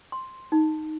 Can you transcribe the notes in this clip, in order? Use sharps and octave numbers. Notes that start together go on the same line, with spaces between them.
C6
D#4